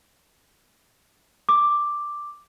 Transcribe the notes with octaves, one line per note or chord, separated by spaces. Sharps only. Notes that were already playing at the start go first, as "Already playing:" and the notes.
D6